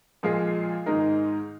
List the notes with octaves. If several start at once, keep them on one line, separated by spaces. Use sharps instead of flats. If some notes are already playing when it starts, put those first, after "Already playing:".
A#2 F3 G#3 F4 G#4
G#2 D#3 G#3 D#4 A#4